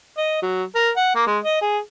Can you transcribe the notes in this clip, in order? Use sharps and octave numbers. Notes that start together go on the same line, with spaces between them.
D#5
F#3
A#4
F#5
A#3
G#3
D#5
G#4